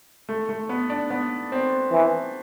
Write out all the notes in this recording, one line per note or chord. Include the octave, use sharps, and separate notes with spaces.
A3
A3
B3
D4
B3
C4
E3